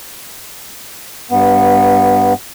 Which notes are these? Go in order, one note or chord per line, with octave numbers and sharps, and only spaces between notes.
G2 B3